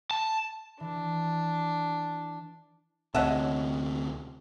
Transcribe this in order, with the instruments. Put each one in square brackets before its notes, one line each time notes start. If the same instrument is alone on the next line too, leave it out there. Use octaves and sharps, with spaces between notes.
[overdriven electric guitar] A5
[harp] E3 [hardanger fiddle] D4
[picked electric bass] D2 C3 [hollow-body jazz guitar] C#5 D#5 A5 [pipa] E5 F#5